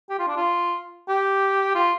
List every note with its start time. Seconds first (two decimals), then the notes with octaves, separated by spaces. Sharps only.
0.10 G4
0.19 F4
0.28 D4
0.37 F4
1.08 G4
1.75 F4